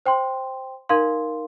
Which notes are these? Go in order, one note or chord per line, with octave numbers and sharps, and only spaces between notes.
C5 G5 C6
D#4 A#4 F5 C6